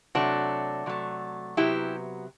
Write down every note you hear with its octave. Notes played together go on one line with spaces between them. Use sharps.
C3 F#3 A3 D4 F#4
C3 F#3 A3
C3 F#3 B3 E4 G4